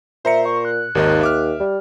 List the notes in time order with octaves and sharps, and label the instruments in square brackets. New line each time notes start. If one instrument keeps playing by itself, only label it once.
[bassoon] A#2 [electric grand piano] C5 A#5 C#7 [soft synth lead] E5
[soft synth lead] C#6
F#6
[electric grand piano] G#1 D#3 D#5 [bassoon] D#2
[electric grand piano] E5 D6 F6
[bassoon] G3